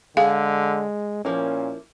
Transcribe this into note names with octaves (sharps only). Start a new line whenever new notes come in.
D3 G#3 G#4 F5
A#2 F3 A#3 C#4 E4